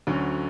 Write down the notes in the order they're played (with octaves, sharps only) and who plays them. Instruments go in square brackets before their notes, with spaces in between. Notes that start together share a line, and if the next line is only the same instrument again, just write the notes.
[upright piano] D2 D3 F#3 C#4